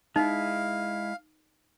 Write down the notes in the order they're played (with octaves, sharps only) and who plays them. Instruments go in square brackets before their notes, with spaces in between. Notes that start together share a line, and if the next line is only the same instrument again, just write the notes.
[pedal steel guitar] G#3 E4 [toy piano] D#4 [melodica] F5